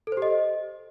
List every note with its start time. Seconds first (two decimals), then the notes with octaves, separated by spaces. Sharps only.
0.07 A4
0.12 C5
0.17 G4
0.22 D#5